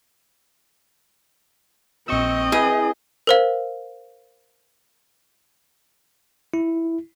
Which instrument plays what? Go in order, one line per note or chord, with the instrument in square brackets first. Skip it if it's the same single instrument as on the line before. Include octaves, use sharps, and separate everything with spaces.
[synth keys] A#1 C#6 E6 [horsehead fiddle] C4 D#5
[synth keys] E4 B4 [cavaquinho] G#4
[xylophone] A#4 C5 F5
[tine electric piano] E4